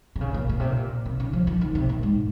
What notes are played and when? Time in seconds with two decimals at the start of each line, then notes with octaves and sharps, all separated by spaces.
0.16 C3
0.21 C#3
0.34 A#2
0.49 A#2
0.60 C3
0.70 A#2
1.06 C3
1.20 C#3
1.33 F3
1.47 F3
1.61 D#3
1.75 C3
1.89 A#2
2.03 G#2